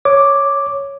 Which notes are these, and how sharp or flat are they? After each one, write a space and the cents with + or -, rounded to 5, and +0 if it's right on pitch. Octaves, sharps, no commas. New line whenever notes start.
C#5 +0 D6 +0